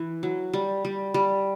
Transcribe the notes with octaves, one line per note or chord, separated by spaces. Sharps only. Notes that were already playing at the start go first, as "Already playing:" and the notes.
Already playing: E3
F#3
G3
G3
G3